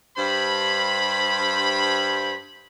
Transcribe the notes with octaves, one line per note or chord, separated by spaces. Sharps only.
G2 C5 B5